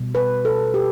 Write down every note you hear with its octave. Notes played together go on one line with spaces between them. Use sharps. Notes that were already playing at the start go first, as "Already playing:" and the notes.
Already playing: B2 G3
B4
A4
G4